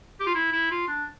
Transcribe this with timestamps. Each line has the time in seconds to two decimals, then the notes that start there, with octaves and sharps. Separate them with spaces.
0.20 G4
0.27 F4
0.35 E4
0.53 E4
0.71 F4
0.88 D4